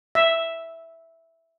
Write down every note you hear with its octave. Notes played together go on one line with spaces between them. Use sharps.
E5